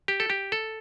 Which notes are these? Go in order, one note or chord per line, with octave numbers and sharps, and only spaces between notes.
G4
A4
G4
A4